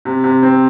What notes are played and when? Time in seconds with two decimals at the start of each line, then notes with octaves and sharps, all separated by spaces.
0.05 C3
0.24 C3
0.43 C4